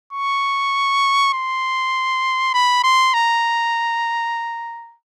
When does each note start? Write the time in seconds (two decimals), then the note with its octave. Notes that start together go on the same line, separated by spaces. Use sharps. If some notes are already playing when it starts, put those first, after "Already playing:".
0.13 C#6
1.34 C6
2.54 B5
2.84 C6
3.14 A#5